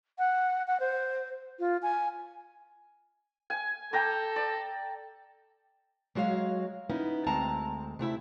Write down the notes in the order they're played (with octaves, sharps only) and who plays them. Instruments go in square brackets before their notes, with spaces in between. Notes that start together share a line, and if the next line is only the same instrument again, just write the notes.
[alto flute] F#5
F#5
C5
F4
G#5
[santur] G#5
[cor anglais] A4 [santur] G5 A#5 D6
[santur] D5
[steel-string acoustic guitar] F#3 G#3 F#4 C#5 F5
B3 C#4 D#4 E4
D2 G#3 C4 A5 A#5
C3 A3 E4 E5